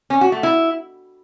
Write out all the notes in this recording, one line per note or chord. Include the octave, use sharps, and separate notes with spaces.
C#4
F#4
A3
E4